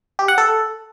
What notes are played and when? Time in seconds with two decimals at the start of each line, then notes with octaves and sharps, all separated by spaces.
0.19 G4
0.28 F#5
0.38 A4